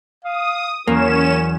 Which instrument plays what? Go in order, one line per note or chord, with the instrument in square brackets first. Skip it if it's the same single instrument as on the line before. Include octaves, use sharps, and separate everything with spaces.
[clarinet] F5 [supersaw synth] D#6
[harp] E2 F#3 [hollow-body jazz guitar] A#3 [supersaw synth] C#4 E7 [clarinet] A#4